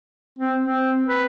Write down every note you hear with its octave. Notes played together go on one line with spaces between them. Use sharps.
C4
C4
B4